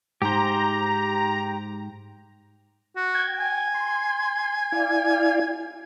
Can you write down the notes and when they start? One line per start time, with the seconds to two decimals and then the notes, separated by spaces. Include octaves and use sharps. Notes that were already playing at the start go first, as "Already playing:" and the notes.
0.22 G#2 G4 C5 A#5
2.96 F#4
3.15 G5 G#6
3.40 G#5
3.74 C6
4.72 E4 D5 F5